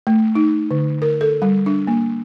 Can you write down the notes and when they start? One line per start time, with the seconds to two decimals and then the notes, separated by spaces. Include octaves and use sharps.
0.07 A3
0.35 D#4
0.71 D3
1.02 A#4
1.21 A4
1.42 G3
1.66 D4
1.87 A#3